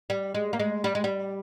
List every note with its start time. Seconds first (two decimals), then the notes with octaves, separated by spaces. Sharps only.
0.10 G3
0.35 G#3
0.53 A#3
0.59 G#3
0.84 G3
0.95 G#3
1.04 G3